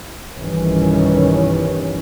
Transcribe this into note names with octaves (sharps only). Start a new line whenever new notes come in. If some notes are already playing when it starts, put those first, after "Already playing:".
B1 G2 D#3 E3 G3 C#4